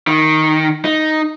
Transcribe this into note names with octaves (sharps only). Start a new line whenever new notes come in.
D#3
D#4